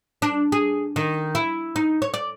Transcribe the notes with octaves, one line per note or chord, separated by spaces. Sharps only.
D4
G#4
D#3
E4
D#4
C#5
D5